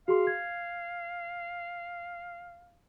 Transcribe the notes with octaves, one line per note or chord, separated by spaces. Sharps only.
F#4 G#4 F5 C6
G#6